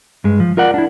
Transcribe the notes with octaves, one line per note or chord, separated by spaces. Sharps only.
G2 G#3
F3
F4 A#4 D5 F#5
D4 E4